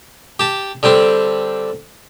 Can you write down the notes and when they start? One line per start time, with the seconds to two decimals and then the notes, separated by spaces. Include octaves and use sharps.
0.40 G4 A5
0.83 D3 G3 C4 D4